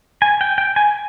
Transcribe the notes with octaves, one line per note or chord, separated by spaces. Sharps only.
G#5
G5
G5
G#5